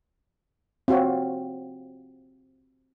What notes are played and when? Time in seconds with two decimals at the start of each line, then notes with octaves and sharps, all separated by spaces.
0.88 C4 F4 F#4 C#5